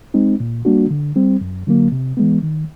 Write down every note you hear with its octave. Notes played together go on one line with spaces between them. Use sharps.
G#3 C4 D#4
A#2
G3 A#3 D4 F#4
D3
G3 C4
F#2
D3 F#3 A#3
C3
E3 G#3 B3
D#3